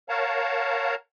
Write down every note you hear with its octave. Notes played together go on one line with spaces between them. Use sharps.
A#4 C#5 F5 F#5 A5 A#5